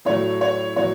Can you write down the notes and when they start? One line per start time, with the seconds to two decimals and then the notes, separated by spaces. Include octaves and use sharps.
0.05 A2 F#3 A3 C#5
0.41 C#5
0.76 A2 F#3 C#5